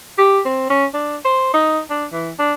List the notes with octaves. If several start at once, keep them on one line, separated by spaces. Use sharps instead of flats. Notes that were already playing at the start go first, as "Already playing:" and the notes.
G4
C4
C#4
D4
C5
D#4
D4
E3
D4